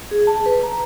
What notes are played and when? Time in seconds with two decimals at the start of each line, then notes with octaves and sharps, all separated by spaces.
0.11 G#4
0.27 A5
0.46 B4
0.63 A#5